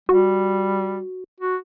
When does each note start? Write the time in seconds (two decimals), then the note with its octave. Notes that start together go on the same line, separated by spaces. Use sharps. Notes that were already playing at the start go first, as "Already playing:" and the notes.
0.09 G3 F#4
1.40 F#4